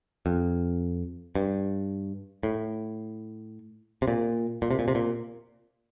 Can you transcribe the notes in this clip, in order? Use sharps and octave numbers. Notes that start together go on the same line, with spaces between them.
F2
G2
A2
C3
A#2
A#2
C3
A#2
C3
A#2